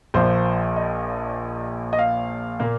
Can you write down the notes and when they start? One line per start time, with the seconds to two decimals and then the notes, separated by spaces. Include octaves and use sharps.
0.14 A#1 A#2 F3 A#3 C5
0.76 D#5
1.93 D#5
1.99 F5
2.60 A#2 A#3